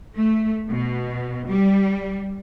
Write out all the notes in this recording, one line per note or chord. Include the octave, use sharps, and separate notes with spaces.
A3
B2
G3